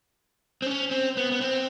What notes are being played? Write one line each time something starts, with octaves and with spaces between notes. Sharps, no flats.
C4
C#4
C4
B3
B3
C4